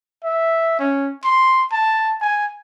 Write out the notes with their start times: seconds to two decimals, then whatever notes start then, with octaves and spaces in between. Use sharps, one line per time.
0.24 E5
0.79 C#4
1.24 C6
1.72 A5
2.21 G#5